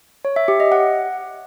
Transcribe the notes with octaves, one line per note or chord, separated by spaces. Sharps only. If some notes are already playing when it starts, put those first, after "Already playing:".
C#5
E5
G4
D#5
F#5